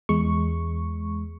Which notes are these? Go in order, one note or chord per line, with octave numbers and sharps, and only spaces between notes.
E2 G#3 C#6